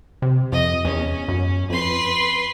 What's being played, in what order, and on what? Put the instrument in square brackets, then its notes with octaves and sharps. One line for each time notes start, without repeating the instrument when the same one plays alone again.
[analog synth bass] C3
[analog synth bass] F2 [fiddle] D#5
[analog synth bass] E2 [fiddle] C#4
[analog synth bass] F#2
[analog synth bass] F2 [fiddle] B4 C6